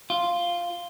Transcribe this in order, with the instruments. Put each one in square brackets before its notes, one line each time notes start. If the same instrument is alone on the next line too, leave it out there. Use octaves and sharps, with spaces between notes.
[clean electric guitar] F4